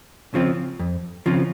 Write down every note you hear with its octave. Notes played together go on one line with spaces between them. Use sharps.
C#3 F3 C4 F4
F2
C#3 F3 C4 F4